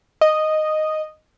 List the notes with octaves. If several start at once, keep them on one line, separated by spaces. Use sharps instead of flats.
D#5